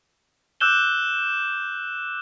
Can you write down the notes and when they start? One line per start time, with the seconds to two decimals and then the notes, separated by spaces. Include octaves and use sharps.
0.60 D6 E6 F#6 G6 E7 G7